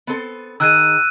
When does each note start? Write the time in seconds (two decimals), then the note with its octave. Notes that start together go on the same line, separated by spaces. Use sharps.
0.07 B3 C4 A4
0.60 D#3 G#4 E6 F#6 D#7